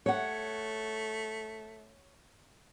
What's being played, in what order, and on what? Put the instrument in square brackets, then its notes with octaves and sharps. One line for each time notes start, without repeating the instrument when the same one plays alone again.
[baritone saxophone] A3 [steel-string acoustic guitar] C#5 F#5